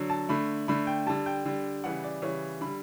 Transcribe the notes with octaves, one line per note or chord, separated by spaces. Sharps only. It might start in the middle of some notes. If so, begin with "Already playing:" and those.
Already playing: D3 F#3
A5
D3 A3 B5
D3 A3 B5
G5
D3 G3 A5
G5
D3 G3
C#3 E3 G3 F#5
D5
C#3 E3 G3 C#5
D3 G3 B5